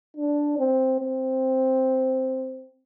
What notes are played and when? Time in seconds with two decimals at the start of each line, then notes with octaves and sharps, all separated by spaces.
0.17 D4
0.59 C4
1.01 C4